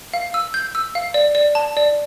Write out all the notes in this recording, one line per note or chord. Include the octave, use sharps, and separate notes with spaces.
F5
E6
G6
E6
F5
D5
D5
A5
D5